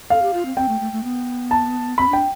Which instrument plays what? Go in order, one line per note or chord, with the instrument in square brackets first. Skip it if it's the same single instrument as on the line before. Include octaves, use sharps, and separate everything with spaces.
[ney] A4 [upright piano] F5
[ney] G4
F4
C4
[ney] C4 [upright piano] G5
[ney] A3
A3
A3
B3
[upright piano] A5
[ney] C4 [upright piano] B5
[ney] D4 [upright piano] G5